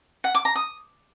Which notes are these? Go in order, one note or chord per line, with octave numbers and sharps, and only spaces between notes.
F#5
D6
A#5
D#6